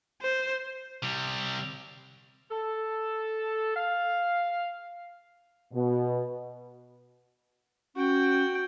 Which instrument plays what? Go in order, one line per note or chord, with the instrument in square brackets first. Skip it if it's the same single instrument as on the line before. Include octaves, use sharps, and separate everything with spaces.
[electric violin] C5
[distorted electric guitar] C3 G3
[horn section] A4
F5
[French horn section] B2
[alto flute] C#4 [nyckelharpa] F#4 G5